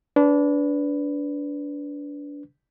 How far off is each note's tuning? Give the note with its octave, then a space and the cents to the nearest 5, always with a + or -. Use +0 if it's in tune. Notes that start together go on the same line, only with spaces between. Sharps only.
D4 -25 B4 +5